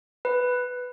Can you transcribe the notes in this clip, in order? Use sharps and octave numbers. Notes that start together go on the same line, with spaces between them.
B4